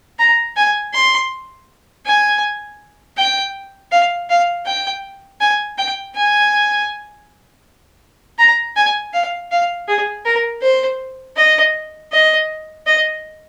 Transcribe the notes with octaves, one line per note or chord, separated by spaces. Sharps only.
A#5
G#5
C6
G#5
G5
F5
F5
G5
G#5
G5
G#5
A#5
G#5
F5
F5
G#4
A#4
C5
D#5
D#5
D#5